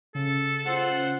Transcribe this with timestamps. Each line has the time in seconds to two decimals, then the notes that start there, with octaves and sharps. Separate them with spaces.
0.15 C#3 A4
0.66 F4 C5 F#5 F#6